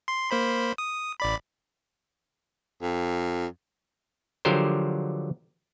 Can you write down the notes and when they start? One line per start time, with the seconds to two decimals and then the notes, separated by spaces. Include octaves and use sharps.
0.08 C6
0.31 A#3 C5 B5
0.78 D#6
1.20 A1 D5 B5
2.82 F2
4.45 D3 F3 F#3 G4 A#4 C5